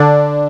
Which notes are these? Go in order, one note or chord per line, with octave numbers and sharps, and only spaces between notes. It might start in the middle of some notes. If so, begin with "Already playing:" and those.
Already playing: D3 D4